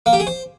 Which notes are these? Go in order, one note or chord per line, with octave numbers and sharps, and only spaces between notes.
A#3
G4
G#4
C5